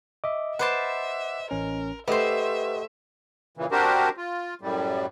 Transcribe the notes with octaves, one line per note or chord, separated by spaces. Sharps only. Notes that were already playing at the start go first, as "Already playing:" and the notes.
D#5 E5 D6
B4 C5 E5 F#5 A5 D6
A1 C#4 A#4
A3 G4 B4 C5 D#5 E5 F#5
A#2 C#3 E3
C4 D4 F#4 G4 A#4 C5
F4
F#2 A2 G3